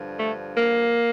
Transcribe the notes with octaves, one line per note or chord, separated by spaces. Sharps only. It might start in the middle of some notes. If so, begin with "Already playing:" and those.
Already playing: G2 D3 F3
A3
A#3